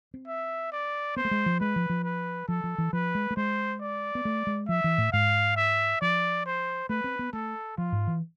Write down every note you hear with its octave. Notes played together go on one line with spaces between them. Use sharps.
C4
E5
D5
B3 C5
A3
G#3
F3
G#3 B4
F3
F3
B4
F3 A4
F3
E3
F3 B4
G#3
A3
G#3 C5
D5
B3
A3
G#3
F3 E5
E3
A2
G#2 F5
E5
F3 D5
C5
A3 B4
C4
B3
A3 A4
F3 F4
G#2
E3